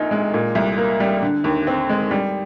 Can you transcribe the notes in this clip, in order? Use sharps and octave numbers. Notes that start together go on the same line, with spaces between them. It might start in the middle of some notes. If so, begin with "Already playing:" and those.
Already playing: A#1 A#2 D#4
G#3
A#2
C2
A#3
G3
D3
D#2
C4
G#3
G3